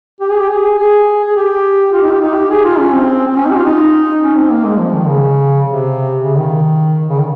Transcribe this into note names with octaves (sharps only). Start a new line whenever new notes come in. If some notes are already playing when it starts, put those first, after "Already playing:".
G4
G#4
G4
G#4
G#4
G#4
G4
F4
D#4
G4
D#4
G4
G#4
F4
C#4
C4
C4
C#4
D#4
G4
F4
D#4
C#4
C4
A#3
G#3
F3
D#3
C#3
C3
C#3
D#3
C#3
D#3